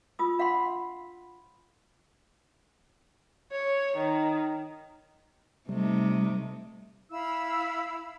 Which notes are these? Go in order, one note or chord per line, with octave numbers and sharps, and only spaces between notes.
F4 B5 D#6 E6
D4 F5 F#5 B5 C6
C#5
D#3
C3 G3 A3 D#4
E4 F5 B5 E6